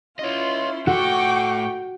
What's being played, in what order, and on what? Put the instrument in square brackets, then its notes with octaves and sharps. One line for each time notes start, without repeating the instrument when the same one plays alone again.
[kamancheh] C#4 E4 [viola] F4 C6 [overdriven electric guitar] C#5 D#5
[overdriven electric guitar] A2 A4 [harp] F#4 [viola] G5 [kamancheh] C#6 D6